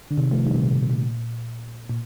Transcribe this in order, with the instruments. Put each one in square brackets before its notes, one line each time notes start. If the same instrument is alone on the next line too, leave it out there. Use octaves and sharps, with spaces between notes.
[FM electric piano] D3
C3 D#3
F3 A3
D#3 G3
C3
A#2
A#2
C3
A#2
A#2